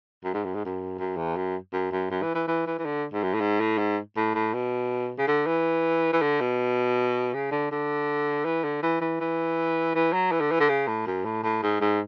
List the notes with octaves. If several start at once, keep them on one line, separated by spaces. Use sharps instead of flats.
F#2
G#2
F#2
G#2
F#2
F#2
E2
F#2
F#2
F#2
F#2
E3
E3
E3
E3
E3
D3
G#2
F#2
A2
G#2
A2
G#2
A2
A2
B2
C#3
D3
E3
E3
D3
B2
C#3
D3
D3
E3
D3
E3
E3
E3
E3
F#3
E3
D3
E3
D3
C#3
A2
F#2
A2
A2
G#2
G#2